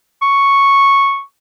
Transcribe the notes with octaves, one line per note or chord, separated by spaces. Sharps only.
C#6